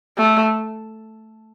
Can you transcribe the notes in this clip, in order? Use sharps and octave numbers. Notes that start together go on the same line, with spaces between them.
A3